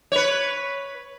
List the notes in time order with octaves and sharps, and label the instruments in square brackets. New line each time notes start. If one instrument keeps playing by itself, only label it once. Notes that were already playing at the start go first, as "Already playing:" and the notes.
[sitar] B4 C#5